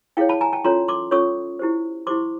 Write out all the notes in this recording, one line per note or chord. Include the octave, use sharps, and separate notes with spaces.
E4 G#4 C#5 F5 G5
A5 B5
G#5 A#5
G5 A5
C#4 F4 A4 C#5 A#5 C6
C6 D6
C#4 F4 A4 C#5 C#6 D#6
E4 G4 C5
E4 G4 C5 C6 D6